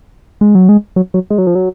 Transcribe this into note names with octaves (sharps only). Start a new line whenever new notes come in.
G#3
F#3
G#3
F#3
F#3
G#3
F#3
F3
F#3